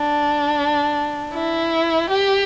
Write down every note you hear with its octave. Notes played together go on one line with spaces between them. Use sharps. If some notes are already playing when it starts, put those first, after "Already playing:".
Already playing: D4
E4
G4